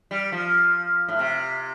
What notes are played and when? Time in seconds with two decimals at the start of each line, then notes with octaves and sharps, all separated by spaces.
0.11 G3
0.32 F3
1.08 A2
1.19 C3